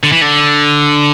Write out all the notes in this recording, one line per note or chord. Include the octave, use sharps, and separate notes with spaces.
D3
E3
D3